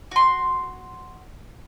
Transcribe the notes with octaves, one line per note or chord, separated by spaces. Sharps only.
F#4 C6